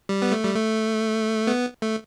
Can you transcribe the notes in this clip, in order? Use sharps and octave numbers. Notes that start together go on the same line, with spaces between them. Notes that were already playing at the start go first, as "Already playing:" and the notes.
G3
B3
A3
G3
A3
B3
A3